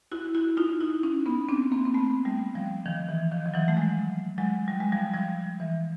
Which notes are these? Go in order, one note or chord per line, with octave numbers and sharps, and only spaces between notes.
E4 F#4
E4 F#4
D#4 F4
E4 F#4
C#4 D#4
B3 C#4
C4 D4
A#3 C4
C4
A3 B3
G3 A3
F3 G3
D#3 F3
E3
D#3 F3
F3
E3 F#3
A3
F#3 G#3
F#3 G#3
G3
G#3
F3 G3
F3 G3
E3